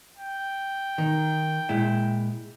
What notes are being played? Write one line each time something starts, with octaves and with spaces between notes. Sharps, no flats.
G5
D#3
A#2 G#3 E4